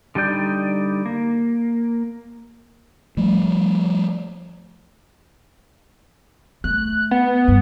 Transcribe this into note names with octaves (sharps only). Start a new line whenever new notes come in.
D3 G3 D#4 D5 G6
A#3
F3 G3 A3
A3 F#6
B3
G2